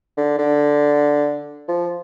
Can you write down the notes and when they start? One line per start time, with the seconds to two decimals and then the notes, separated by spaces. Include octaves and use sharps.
0.17 D3
0.38 D3
1.68 F3